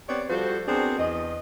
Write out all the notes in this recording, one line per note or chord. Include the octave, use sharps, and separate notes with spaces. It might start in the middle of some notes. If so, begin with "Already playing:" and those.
B3 C4 G4 C#5 D5
F3 G3 F#4 A4 C5
B3 C4 D4 F#4 G#4 A#4
E2 D#5